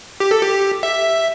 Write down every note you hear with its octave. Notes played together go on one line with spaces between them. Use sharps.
G4
A4
G4
E5